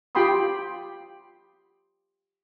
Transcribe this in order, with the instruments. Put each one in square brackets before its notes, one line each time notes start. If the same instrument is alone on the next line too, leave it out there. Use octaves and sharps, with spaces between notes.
[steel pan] F4 G4 G5 B5 C6 D#6